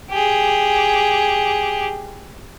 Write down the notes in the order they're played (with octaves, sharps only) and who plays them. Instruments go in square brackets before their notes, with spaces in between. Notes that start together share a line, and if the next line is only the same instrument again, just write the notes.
[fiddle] G4 G#4